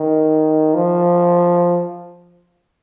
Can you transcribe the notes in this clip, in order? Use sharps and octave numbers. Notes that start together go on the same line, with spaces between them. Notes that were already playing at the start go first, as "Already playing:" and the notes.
Already playing: D#3
F3